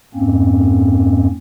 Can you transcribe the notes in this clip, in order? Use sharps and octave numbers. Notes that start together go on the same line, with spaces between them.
F2 G#2 A#3 C4 C#4